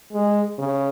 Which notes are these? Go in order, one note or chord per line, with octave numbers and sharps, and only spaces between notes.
G#3
C#3